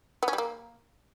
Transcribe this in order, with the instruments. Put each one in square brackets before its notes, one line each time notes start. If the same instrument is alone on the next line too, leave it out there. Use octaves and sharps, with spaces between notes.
[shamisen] B3
C#4
G3
A#3